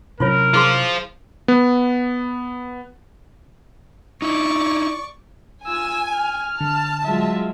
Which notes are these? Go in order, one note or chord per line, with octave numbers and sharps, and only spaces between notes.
C3 F#3 C#4 E4 F4 A#4 C#5
F3 E4 F4 G#4 C6
B3
D#4 E4 D5 C#6
F4 G#5 E6
F6
D3 A5
F#3 G#3 F4 E5